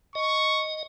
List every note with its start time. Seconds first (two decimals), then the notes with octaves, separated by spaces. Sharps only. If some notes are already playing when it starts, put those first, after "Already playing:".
0.15 D#5 C#6